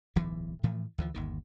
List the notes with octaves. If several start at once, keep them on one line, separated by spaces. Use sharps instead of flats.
D1 B1 G#2 E3
A2 E3 F3 A3
D2 E3 F3
G1 D#2 D#3